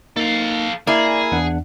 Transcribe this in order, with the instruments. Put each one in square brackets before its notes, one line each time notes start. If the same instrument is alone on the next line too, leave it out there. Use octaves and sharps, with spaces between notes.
[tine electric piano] A#3 D#4 [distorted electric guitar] A4 F5
[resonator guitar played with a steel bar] A#3 E4 [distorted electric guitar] G#4 [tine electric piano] D5 G#5
[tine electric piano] E2 D4 F#5